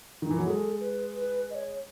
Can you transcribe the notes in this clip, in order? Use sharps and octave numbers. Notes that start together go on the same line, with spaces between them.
D#3
E3
F#3
G#3 A4
B4
B4
D#5
C#5